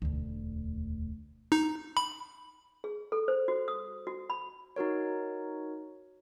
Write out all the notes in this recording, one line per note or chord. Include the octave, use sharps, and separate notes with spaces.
E1 D2
D#4
B5
G#4
A4
C5
F#4
D#6
F#4
B5
D#4 F#4 A#4 C#5